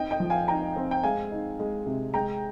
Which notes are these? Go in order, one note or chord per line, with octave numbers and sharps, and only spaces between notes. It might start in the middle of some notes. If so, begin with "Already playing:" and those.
Already playing: C4 D#4 D#5 G5
D#5 G5
F3
F5 G#5
D#4 G5 A#5
C4
G5
G#3 F5 G#5
D#4
G#3
C3
G#3 G5 A#5